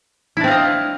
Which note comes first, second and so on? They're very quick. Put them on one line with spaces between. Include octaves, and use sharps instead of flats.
E4 D4 C4 F5 D#5